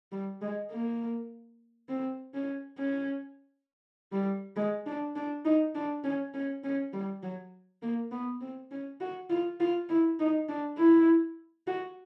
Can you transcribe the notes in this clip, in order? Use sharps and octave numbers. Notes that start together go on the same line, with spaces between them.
G3
G#3
A#3
C4
C#4
C#4
G3
G#3
D4
D4
D#4
D4
C#4
C#4
C#4
G3
F#3
A#3
B3
C4
C#4
F#4
F4
F4
E4
D#4
D4
E4
F#4